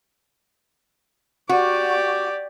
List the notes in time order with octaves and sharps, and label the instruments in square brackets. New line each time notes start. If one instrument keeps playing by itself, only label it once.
[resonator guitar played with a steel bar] F#4 [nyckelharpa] G4 D5